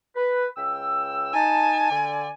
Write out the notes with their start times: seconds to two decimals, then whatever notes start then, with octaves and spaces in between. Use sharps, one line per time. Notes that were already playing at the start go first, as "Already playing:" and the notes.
0.16 B4
0.57 C#2 G5 E6
1.34 D#4 G#5 A5
1.91 D3 D5